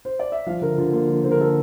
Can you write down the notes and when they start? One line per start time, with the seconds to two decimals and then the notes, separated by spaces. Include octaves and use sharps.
0.05 C5
0.19 D5
0.32 E5
0.46 F3 F5
0.61 D3 A#4
0.78 D3 F4
0.93 A#3 F4
1.09 F3
1.24 D3 C5
1.31 A#4
1.40 D3 A4